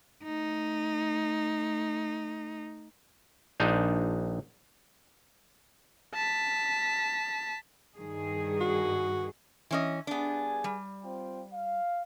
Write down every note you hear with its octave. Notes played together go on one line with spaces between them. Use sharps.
A3 D#4
A#1 D4 D#4 C5
A5 B6
G2 D#3 G#4
F#4
E3 C#4 D#5
G2 B3 D4 G#4 G#5
G3
C4 F4 G5
F5